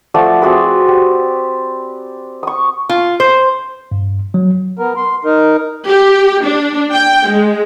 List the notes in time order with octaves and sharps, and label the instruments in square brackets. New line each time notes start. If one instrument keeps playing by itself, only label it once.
[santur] F3 A3 D5 F#5
C4 F#4 G#4 B4
G4
C#6 D#6
[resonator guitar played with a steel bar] F4
C5
[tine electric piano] G2
F#3
[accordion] B3 A#4
C6
D#4 A#4
[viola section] G4
D4
G5
G#3